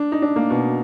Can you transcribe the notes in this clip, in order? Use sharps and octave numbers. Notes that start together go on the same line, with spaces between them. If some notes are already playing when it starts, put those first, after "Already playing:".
Already playing: D4
D#4
D4
A#3
B2